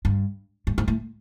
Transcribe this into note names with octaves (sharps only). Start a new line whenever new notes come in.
G2
G2
G#2
A2